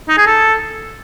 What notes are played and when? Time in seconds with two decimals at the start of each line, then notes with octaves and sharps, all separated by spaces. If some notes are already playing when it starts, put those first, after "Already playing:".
0.08 D#4
0.18 G#4
0.27 A4